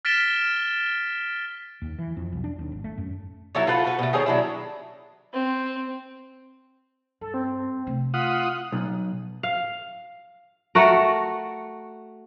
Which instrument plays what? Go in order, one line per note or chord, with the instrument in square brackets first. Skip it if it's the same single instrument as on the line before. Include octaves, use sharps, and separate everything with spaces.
[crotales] F6 A6 B6 D7 E7 G7
[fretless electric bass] D#2
E3
F2
B1
D4
D#2
G#1
A3
F#2
[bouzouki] F#3 E4 A4 C#5
F4 A4 B4 F#5
F#4 B4
B2 A3
D#3 G#4 A4 C#5
F#3 D4 E4
[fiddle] C4
[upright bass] G2 [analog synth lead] A4
[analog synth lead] C4
[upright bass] C3 A3
[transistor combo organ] F4 F#5 D#6 [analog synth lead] B6
[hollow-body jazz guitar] B1
[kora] F5
A3 F#4 A#4